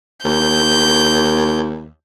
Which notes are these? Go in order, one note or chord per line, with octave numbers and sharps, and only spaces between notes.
D#2 G6